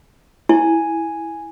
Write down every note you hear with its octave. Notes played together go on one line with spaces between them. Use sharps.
E4 G#5